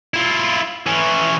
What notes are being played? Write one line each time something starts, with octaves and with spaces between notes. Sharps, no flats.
E4 F4
E3 C#4